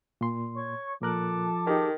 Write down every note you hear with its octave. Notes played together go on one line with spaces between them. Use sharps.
A#2 C6
C#5 C#6
A#2 F3 A4 A#4 A5 D6 F#6
D#3 D#4 G4 G#4